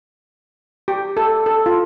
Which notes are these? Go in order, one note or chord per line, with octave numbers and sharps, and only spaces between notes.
G4
A4
A4
F4